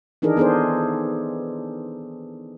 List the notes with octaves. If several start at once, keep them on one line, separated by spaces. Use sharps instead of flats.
D#3 E3 D4 D#4 G#4 A#4
B3 D4 G#4 A4 C5